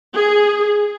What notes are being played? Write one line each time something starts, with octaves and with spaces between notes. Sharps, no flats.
G#4